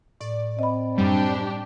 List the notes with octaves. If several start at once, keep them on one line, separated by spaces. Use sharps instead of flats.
A2 D5
C4 D#5 B5
F#2 G3 D4 G4